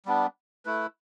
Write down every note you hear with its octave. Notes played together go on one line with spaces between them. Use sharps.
G3 B3 D4
A3 E4 B4